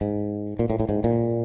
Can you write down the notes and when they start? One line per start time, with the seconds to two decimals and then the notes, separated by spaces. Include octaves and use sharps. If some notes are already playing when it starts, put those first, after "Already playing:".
0.01 G#2
0.59 A#2
0.70 A2
0.80 A2
0.89 G#2
1.04 A#2